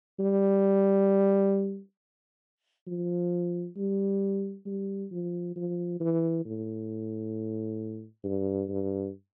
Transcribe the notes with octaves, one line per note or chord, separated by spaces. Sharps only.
G3
F3
G3
G3
F3
F3
E3
A2
G2
G2